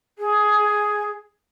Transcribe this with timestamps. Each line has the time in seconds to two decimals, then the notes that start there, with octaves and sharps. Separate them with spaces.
0.19 G#4